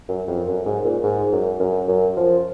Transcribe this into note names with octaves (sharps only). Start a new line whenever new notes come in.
F#2
F2
F#2
G#2
A#2
G#2
F#2
F#2
F#2
F3